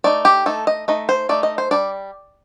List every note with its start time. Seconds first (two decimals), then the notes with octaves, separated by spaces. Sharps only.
0.04 A3 D#4 D5
0.25 G4
0.46 A3 D#4 A4
0.67 D#5
0.88 A3 D#4 D#5
1.09 C5
1.29 A3 D#4 D5
1.43 D#5
1.58 C5
1.71 G3 D4 D5